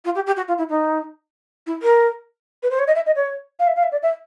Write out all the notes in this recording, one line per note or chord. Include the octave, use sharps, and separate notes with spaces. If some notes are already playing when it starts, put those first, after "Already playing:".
F4
G4
G4
F#4
F4
E4
D#4
E4
A#4
B4
C5
C#5
D#5
E5
D#5
C#5
F5
E5
F5
E5
D5
E5